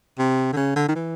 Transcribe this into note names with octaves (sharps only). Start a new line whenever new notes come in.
C3
D3
C#3
D3
D#3
E3